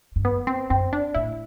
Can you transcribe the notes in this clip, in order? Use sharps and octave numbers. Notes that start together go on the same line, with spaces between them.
G2
F#2 B3
C4
F#2 C4
D4
A2 E4